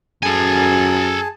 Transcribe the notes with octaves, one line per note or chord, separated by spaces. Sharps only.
F#2 G#4 A4 G#5 A5